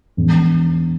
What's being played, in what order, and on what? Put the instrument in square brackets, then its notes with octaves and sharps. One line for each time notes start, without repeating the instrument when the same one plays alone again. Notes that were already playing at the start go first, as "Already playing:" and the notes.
[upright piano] E1